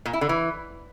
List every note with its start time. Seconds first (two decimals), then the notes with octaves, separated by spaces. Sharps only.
0.06 A#2
0.13 E4
0.21 D3
0.29 E3